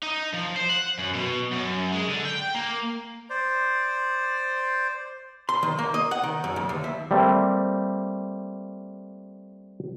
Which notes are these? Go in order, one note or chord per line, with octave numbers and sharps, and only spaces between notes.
D#4
F3
C5
F#5
F#2
B2
F#2
G#3
D3
G5
A#3
C5 D5
C6
D#3
A#3
D#5
F#5
D#3
F#2
D2
D#2
E5
G3 A3 A#3 C4